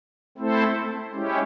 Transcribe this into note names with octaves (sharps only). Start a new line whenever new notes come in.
A3 C4 E4 A4 C5
G#3 C#4 E4 G4